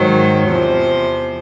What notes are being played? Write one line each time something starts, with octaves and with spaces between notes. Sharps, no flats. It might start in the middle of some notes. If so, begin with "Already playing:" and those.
Already playing: G#2 D#3 F#3 C5
E2 C3 F3 C5